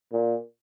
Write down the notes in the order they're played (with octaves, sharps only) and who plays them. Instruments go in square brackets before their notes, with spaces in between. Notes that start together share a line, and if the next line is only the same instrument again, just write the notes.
[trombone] A#2